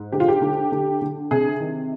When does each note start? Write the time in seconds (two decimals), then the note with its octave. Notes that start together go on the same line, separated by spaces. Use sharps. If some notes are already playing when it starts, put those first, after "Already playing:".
Already playing: G#2
0.12 D3 G4
0.20 F4
0.28 G4
0.41 D3
0.72 D3
1.02 D3
1.31 C3 G#4
1.60 D#3